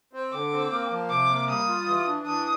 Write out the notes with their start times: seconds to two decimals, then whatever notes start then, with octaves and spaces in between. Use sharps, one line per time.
0.13 C4
0.33 D3 D6
0.52 C4
0.71 A#3
0.91 F3
1.10 C3 D6
1.29 A#3
1.49 G3 D#6
1.68 F4
1.87 E3
2.07 D4
2.26 E3 D#6